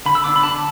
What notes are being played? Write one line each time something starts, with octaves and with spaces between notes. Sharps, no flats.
D3 B5
E6
B3 D4 D6
B5
D3 A5